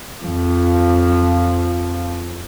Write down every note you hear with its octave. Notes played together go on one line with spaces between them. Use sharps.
F2 F3